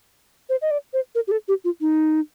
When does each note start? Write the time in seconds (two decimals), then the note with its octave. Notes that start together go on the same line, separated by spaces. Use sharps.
0.49 C5
0.62 D#5
0.71 D5
0.93 C5
1.15 A#4
1.27 G4
1.31 A4
1.48 G4
1.64 F4
1.81 D#4